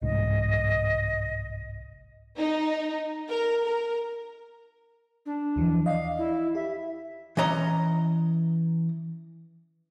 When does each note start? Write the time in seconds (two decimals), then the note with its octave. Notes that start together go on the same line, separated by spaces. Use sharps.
0.02 G1 C2 G#2 D#5
2.38 D#4
3.29 A#4
3.64 A#4
5.26 D4
5.56 D#2 E3 F3
5.86 D5 D#5 F5
6.18 E4
6.55 G4 E5
7.37 E3 C#4 D#5 A#5